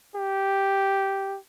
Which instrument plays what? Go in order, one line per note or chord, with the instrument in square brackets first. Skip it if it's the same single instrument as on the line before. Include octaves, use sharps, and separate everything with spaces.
[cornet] G4